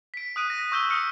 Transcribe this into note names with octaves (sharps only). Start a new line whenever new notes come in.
B6 D7
D#6 F#6 D#7
A#6
C#6 E6 G6 D#7 G7
D#6 F6 C#7